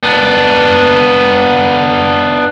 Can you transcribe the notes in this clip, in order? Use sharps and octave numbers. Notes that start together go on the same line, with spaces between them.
B3 D4